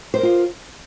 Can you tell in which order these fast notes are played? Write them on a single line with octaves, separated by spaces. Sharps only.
C5 A#4 F4